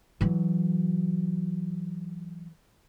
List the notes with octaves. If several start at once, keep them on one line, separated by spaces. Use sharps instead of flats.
E3 F#3